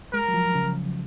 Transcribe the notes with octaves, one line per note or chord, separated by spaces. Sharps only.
G#3 A#4
F#3
F3
C#3